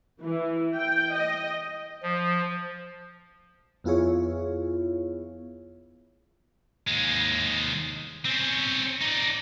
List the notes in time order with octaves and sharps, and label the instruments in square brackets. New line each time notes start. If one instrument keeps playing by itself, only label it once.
[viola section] E3
G5
D#5
[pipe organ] F3
[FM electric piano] F2 B3 E4 F4 G#4 C#5
[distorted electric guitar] D#2 G#3
C4 C#4
D#4 D5